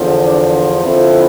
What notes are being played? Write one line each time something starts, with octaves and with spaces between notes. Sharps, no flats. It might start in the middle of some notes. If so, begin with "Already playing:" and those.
Already playing: E2 D3 F3
D4
F2 D3 F3 C4 E4